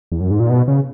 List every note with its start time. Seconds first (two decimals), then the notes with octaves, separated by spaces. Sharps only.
0.12 E2
0.21 F#2
0.31 G#2
0.40 A#2
0.50 B2
0.68 C#3